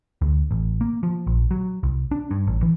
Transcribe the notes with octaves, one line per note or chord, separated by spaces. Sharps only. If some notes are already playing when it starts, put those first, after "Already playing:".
D2
A1
A#3
F3
A#1
F#3
C2
D4
G2
A1
E3